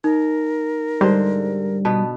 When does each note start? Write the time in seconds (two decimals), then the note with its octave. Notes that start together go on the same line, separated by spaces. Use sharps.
0.04 D#4 A#4
1.01 G#2 D3 G3 C5
1.85 B2 B3 A5